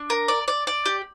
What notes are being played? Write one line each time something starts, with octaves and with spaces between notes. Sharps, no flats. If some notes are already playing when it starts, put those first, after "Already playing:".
Already playing: D4
A#4
D5
D5
D5
G4